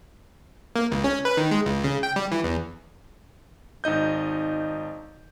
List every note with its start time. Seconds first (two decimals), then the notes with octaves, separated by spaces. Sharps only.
0.76 A#3
0.92 C#2
1.04 C#4
1.25 B4
1.37 D#3
1.51 G#3
1.66 C#2
1.84 C#3
2.03 G5
2.16 G3
2.32 E3
2.44 E2
3.84 G#1 D#4 D#5 G6